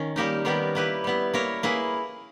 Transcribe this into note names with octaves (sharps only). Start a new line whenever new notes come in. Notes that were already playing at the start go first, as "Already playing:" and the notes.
Already playing: D#3 C#4
G3 A#3 D#4 G4 A#4
D#3 G3 B3 G4 A#4
A#3 E4 G4 B4
G3 B3 E4
A#3 E4 A#4 C#5
A#3 E4 G#4 B4